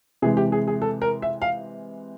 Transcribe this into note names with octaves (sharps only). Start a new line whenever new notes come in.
C3 E3 G#3 G#4
G4
G#4
G#4
A4
A#4
E5
F5